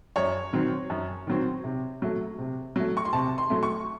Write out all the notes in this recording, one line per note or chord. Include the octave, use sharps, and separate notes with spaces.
F#2 C#5
D#3 F#3 C4
F#2
D#3 F#3 C4
C3
F#3 A3
C3
F#3 A3
C#6
C6
C3 A5
C6
F#3 A3
C#6